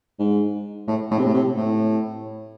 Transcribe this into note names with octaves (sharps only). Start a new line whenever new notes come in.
G#2
A2
A2
C3
A2
C3
A2